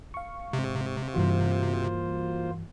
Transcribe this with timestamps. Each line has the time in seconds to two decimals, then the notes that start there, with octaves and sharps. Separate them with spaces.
0.14 F5 C#6
0.53 G#2 C3
1.14 G2 E3 A#3 F4 F#4 C5